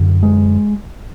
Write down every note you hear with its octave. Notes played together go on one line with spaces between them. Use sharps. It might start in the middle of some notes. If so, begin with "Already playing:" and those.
Already playing: F#2 D3
G#3